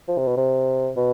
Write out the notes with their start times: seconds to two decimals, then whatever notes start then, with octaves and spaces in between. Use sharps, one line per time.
0.08 F3
0.17 C3
0.27 B2
0.37 C3
0.96 B2